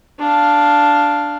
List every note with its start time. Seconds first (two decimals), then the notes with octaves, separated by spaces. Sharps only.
0.19 D4 F5